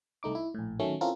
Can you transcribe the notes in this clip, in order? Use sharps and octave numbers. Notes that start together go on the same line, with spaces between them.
C2 A3 D#4 D6
E4
A#1 A2
D#3 F#3 A3 C#4
C4 C#4 E4 F4 A4 A#4